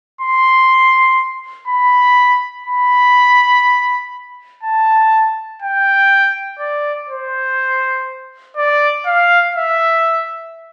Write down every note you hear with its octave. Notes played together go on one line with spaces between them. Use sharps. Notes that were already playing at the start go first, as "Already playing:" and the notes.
C6
B5
B5
A5
G5
D5
C5
D5
F5
E5